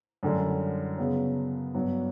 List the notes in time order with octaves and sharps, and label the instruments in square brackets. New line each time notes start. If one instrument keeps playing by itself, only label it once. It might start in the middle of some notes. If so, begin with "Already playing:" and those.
[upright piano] F#2 D3 G3
C#3 F#3 B3
G2 F#3 B3